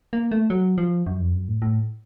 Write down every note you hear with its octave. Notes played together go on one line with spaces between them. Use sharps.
A#3
A3
F#3
F3
F#2
F2
F#2
A2
A2